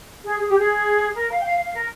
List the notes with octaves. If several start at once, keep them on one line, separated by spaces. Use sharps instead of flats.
G#4
G#4
G4
G#4
A#4
F5
G5
F5
F5
A#4